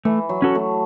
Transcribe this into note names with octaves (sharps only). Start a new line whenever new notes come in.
E3 A3
F#3
C#4 F#4 A4
A3